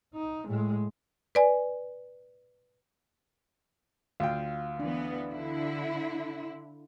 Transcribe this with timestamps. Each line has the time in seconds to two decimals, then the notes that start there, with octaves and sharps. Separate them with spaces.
0.14 D#4
0.48 A2 G#3
1.35 B4 D5 G#5
4.20 D2 F4 F5 G5
4.80 E3 B3 D4
5.29 D3 E4